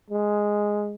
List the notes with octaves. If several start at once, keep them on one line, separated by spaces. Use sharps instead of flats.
G#3